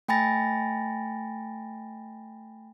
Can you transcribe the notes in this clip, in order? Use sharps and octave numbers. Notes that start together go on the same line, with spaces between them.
A3 G5 G#5 B5 A6 A#6